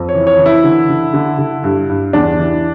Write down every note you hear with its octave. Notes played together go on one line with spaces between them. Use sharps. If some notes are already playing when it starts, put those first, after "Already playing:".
Already playing: F2
C#5
E3
C#5
E3
E4
D3
D3
D3
D3
G2
G2
E2 D4
E3